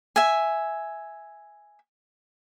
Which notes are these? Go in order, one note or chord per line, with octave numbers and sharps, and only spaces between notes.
E5 G#5